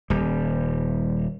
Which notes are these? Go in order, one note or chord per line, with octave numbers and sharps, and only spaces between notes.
D#1 G3